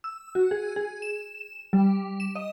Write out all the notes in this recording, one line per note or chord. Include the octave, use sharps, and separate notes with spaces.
E6
F#4
G#4
G#4
E7
G3
E7
D#5